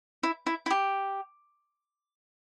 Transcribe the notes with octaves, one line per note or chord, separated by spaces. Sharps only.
E4
E4
E4
G4